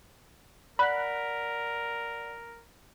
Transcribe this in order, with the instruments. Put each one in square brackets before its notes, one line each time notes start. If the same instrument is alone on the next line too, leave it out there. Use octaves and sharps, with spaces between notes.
[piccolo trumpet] A#4 [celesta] D5 F#5 B6 [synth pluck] B5 F#6